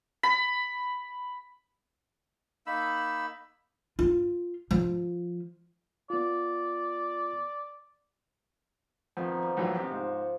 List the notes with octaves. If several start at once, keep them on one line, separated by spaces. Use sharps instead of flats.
B5
A#3 D#4 B5 E6
F4
F3
B3 F4 D5
F2 B2 D#3 F3
G3
A#1 E3 F#3
C3 F3 G4
G#2